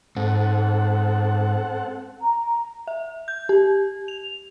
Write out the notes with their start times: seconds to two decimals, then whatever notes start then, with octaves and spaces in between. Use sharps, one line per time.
0.16 G#2 C4 A4 F#5
2.21 A#5
2.87 E5
3.28 G6
3.49 G4
4.08 F7